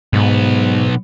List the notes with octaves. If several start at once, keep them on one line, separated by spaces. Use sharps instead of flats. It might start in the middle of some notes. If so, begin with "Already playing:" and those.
B1 G#2 B3